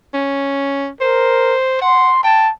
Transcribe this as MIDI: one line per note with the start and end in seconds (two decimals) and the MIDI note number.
0.14 0.88 61
1.01 1.55 70
1.01 1.80 72
1.82 2.11 78
1.82 2.23 84
2.24 2.47 79
2.24 2.51 81